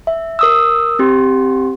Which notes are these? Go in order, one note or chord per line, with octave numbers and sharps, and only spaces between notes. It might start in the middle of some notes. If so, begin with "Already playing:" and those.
E5
A#4 D#6 E6
C4 G4 C6